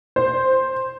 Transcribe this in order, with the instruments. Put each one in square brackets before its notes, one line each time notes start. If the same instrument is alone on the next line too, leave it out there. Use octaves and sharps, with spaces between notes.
[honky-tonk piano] C5